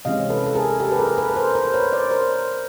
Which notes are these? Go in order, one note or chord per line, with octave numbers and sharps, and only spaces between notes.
C3 E3 G#3 C#4 D#5 F5
A4 B4
A4
G#4 A#4
G4 A4
B4
G#4 A#4
A4 B4
B4
A#4 C5
A#4 C5
B4 C#5
C5 D5
A#4 C5